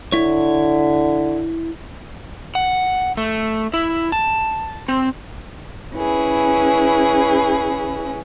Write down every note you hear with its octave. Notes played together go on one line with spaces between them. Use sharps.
D3 E4 C#5
F#5
A3
E4
A5
C4
C#4 E4 G#4 B4